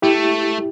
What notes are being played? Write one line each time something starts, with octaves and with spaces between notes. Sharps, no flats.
A3 E4 G4